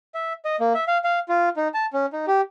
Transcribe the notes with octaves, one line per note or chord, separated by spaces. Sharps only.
E5
D#5
A#3
E5
F5
F5
F4
D#4
A5
C#4
D#4
G4